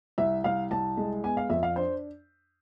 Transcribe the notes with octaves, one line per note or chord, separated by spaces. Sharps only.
C2 E5
C2 F5
C2 A5
G#3
B3 G#5
F5
F2 E5
F5
D4 C5